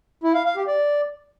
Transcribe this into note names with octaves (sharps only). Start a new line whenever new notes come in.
E4
F5
F5
G4
D5